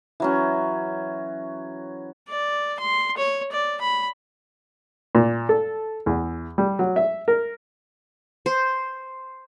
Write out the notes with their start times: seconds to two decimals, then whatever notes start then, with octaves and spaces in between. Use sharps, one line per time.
0.20 E3 F#3 C#4
2.28 D5
2.80 C6
3.17 C#5
3.52 D5
3.81 B5
5.15 A#2
5.49 A4
6.06 E2
6.58 G3
6.79 F#3
6.96 E5
7.28 A#4
8.46 C5